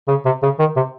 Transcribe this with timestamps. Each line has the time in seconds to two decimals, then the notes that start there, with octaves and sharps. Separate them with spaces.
0.08 C#3
0.26 C3
0.43 C#3
0.59 D#3
0.76 C3